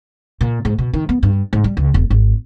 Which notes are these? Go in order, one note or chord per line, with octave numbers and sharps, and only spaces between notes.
A#2
G#2
B2
D#3
B3
G2
G#2
G3
C#2
E1
G#1